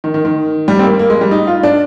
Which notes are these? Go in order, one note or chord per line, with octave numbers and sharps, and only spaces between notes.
D#3
D#3
D#3
G3
C4
A#3
A#3
G#3
G3
D#4
F4
D4